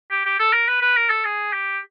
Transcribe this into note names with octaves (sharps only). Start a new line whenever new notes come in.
G4
G4
A4
A#4
B4
B4
A#4
A4
G#4
G4